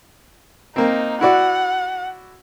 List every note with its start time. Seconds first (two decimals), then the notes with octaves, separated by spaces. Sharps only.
0.76 A#3 C4 D#4
1.21 E4 F#4 D5 F#5